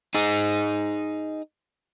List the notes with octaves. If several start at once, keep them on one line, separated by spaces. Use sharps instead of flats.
D#4 G#4